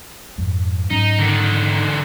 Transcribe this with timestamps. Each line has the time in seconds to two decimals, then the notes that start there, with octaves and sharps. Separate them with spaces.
0.38 F2 G#2
0.90 G#2 F#3 C#4 D#4
1.19 D3 D#3